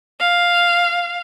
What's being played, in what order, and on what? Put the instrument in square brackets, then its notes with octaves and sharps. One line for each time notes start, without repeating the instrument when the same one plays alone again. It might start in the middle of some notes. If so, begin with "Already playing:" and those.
[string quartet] F5